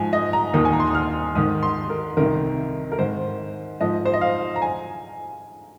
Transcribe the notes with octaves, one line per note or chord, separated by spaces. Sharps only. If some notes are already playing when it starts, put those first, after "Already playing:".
Already playing: G#2 F3 G#5
D#5
A#5
D#2 D#3 D#6
G#5
A#5
C6
D#6
F6
G#2 D#3 D#6
C6
A#4
C2 C3 D#3 A#4
A#4
G#2 D#3 C5
G#2 F3 D#5
C5
D#5
F5
A#5
G#5